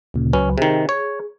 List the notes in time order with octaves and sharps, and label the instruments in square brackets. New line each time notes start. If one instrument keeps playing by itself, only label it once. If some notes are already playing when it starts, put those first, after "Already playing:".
[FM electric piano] D2 A#2 C#3
[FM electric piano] C#2 F#3 B4 [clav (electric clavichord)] C#4
[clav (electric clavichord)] C3 D#3 [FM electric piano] G#4
[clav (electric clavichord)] C#5